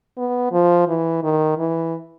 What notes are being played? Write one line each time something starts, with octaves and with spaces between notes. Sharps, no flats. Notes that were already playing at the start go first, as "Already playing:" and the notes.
B3
F3
E3
D#3
E3